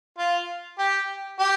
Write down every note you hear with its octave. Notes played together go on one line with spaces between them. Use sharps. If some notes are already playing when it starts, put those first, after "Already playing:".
F4
G4
G4